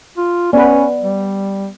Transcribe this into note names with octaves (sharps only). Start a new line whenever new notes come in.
F4
B3 C#4 B4 D5
G3